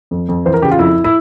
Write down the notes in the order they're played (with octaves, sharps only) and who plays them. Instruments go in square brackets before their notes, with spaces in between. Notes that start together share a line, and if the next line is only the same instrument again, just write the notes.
[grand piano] F2
F2
E3 C5
A#4
C#3 G4
F4
F2 E4
E4